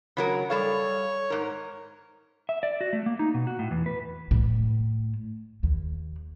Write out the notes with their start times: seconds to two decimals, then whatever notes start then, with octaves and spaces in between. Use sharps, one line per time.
0.17 C#3 F#3 A#4
0.50 G3 A4 C#5 F5
1.30 G#2 A#4
2.49 E5
2.63 D5
2.81 F#4
2.93 A3
3.06 A#3
3.19 D#4
3.34 B2
3.47 F#4
3.59 A2
3.71 E2
3.86 B4
4.31 A2
5.63 D#2